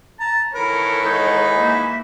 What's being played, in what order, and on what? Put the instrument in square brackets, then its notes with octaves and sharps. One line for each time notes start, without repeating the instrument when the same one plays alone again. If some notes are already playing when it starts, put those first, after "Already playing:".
[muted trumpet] A5 [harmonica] A#5
[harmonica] D#3 E3 B5 [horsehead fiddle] A4 C#5 [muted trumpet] A#4
[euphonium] G#2 [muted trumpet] D#4
[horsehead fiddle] A#3 E5